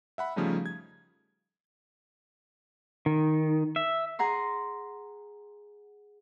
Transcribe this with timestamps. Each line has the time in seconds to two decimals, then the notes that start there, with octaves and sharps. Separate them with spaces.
0.18 E5 F#5 B5
0.36 C#3 F3 G3 A3 C#4 D#4
0.66 G#6
3.06 D#3
3.76 E5
4.19 G#4 F#5 A#5 C6